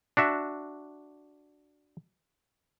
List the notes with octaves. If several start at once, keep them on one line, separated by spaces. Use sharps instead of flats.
D4 F#4 E5